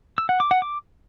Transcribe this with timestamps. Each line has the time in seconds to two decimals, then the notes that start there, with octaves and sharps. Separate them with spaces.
0.18 E6
0.29 F#5
0.40 D6
0.51 F#5
0.62 D6